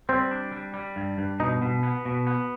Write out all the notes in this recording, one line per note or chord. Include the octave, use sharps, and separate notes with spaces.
G3 C4
D4
G3
G3
G2
G2
B2 D#4
B2
B3
B2
B3